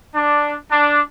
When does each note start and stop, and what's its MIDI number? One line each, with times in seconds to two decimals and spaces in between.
0.14 0.53 62
0.70 0.99 62